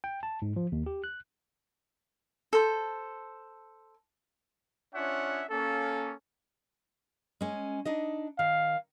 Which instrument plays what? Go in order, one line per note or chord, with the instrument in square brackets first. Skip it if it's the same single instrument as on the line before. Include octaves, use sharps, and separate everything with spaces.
[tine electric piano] G5
A5
G#2
F3
D#2
G4
F#6
[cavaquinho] A4 C5
[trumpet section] C#4 D4 F4 C#5 E5 F#5
A#3 C#4 A4
[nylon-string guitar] G#3 C#4
D4 D#4 D#5
[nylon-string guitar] D#3 [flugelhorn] F5